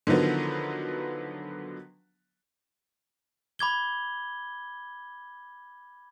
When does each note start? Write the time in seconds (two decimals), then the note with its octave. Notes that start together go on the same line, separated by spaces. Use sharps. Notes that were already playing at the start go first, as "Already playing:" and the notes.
0.07 D3 D#3 F3 F#3 B3
3.59 B5 D6 G#6 G7